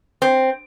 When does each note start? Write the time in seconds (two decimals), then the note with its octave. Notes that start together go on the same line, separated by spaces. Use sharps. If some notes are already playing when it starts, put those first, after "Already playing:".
0.22 C4